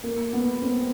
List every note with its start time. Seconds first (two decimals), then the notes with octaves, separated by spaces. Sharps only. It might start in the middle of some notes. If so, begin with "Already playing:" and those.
0.03 A#3
0.33 B3
0.62 C4